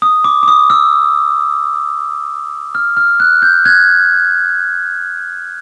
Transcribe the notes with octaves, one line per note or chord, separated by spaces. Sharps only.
D#6
D6
D6
D#6
E6
F6
F6
F#6
G6
F#6 G#6